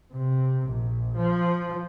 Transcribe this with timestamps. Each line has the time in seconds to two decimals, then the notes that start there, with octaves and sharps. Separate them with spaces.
0.13 C3
0.67 A#1
1.17 F3